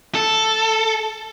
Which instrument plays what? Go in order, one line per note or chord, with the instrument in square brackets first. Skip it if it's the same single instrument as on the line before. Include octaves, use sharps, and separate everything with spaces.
[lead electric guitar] A4